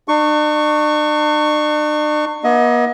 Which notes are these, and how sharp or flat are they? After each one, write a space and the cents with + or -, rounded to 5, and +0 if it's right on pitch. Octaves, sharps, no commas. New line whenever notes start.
D4 +45 C#6 +0
B3 -45 D#5 +25